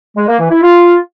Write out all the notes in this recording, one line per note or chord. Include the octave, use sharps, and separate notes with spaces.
G#3
A#3
E3
E4
F4